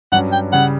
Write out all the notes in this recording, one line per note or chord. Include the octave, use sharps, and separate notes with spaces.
G2 F#3 C#4 F#5
G5
C#3 G3 F#5